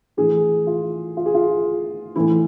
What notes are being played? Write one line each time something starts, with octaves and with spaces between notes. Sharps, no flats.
A2 E3 G#4
F4
F4
G#4
F4
A2 E3 E4